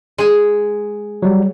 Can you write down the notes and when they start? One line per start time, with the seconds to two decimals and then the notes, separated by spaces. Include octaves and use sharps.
0.18 G#3 G#4
1.22 F#3 G3